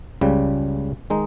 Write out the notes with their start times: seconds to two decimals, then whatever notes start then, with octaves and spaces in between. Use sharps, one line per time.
0.21 C#2 C#3 G3
1.10 D#3 G#3 D#4